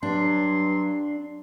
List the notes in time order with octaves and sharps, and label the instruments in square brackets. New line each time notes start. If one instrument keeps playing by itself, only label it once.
[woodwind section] G2 F#3 C6 [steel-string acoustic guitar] D4